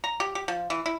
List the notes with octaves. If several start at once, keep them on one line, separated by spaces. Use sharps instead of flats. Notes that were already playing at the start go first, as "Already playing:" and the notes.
A#5
G4
G4
F3
E3
E4